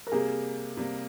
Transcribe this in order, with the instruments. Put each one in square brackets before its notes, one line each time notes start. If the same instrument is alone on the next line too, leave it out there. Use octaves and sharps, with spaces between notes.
[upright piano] A#4
[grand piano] C3 G3 A#3 [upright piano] G#4
[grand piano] C3 G3 A#3